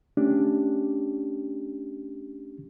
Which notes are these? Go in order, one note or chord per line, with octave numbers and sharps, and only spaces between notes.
A3 C#4 D4 G4